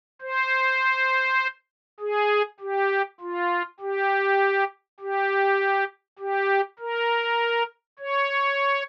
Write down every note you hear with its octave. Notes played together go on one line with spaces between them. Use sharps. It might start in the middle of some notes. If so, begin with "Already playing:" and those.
C5
G#4
G4
F4
G4
G4
G4
A#4
C#5